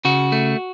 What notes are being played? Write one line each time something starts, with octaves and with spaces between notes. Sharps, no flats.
C#3 F#4
A3